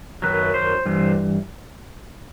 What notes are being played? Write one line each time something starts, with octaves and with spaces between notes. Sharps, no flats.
F#2 D#3 F#3 B4
C5
G2 E3